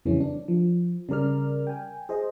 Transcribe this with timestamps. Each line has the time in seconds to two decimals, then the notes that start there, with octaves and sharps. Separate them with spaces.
0.05 F2 C#3 E3 G3 C#4
0.20 D4
0.48 F3
1.09 C#3 G3 A#4 D5 F6
1.67 G5 G#5
2.09 G#4 C5 D#5